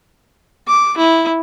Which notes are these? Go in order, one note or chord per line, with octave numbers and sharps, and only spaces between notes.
D6
E4